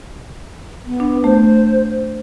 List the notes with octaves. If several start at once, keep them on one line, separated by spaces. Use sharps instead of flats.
B3
D4
A3 C5